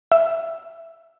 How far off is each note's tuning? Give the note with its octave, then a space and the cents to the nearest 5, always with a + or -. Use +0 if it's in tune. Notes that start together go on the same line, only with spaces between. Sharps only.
E5 +5